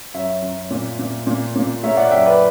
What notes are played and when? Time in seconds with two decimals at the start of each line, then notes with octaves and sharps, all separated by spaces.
0.14 F#2 C#5 E5
0.42 F#2
0.71 A#2
0.99 A#2
1.27 A#2
1.56 A#2
1.83 A#3 C#5 E5
1.97 D5 F#5
2.11 F#2 E5 G5
2.25 B4 D5